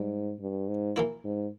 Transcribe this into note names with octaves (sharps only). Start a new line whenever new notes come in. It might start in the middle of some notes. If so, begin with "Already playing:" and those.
Already playing: G#2 G3
G2
G#2
E3 A#3 E4
G#2